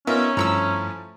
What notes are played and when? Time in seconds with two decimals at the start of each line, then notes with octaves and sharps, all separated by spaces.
0.07 B3 C#4 D#4 F4 A#4 E5
0.37 G2 F3 A3 E4 A#5 C#6 E6